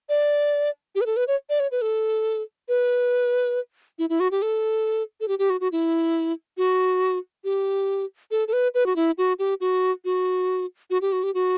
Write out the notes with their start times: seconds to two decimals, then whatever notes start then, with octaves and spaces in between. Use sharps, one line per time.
0.09 D5
0.96 G4
1.01 B4
1.06 A4
1.17 B4
1.28 C#5
1.50 D5
1.60 C#5
1.72 B4
1.82 A4
2.69 B4
3.99 E4
4.10 E4
4.20 F#4
4.31 G4
4.42 A4
5.21 A4
5.28 G4
5.39 G4
5.50 F#4
5.61 F#4
5.72 E4
6.58 F#4
7.44 G4
8.31 A4
8.48 A4
8.53 B4
8.75 B4
8.86 F#4
8.96 E4
9.18 F#4
9.39 G4
9.61 F#4
10.05 F#4
10.90 F#4
11.02 G4
11.12 F#4
11.23 G4
11.34 F#4